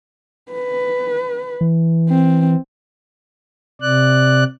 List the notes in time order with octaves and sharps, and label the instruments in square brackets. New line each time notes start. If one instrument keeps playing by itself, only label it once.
[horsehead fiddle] B4
[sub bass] E3
[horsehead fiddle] C4
[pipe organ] C3 D5 F#6